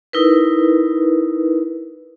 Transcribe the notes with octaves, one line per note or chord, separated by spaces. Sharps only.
D#4 E4 A#4 B4